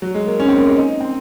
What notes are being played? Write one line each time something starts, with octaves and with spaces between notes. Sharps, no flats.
F#3
G#3
A#3
C#4
C4
A#3
G#3
D#4
C4